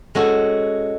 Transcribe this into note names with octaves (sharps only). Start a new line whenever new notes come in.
G#3 C#4 F#4 A4